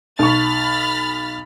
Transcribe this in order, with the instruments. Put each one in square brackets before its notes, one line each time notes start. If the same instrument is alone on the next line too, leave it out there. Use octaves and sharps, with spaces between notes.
[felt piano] B1 C#6 [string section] B5 F6 A6